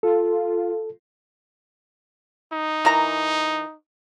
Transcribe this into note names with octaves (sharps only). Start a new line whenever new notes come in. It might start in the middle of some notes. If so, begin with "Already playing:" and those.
F4 A4
D#4
E3 A#4 A#5